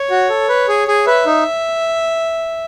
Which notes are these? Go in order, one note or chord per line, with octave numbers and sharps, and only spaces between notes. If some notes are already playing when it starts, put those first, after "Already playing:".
Already playing: C#5
F#4
A4
B4
G#4
G#4
B4 E5
D#4